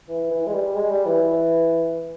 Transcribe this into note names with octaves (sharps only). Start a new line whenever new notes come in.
E3
E3
G#3
G3
G#3
G3
E3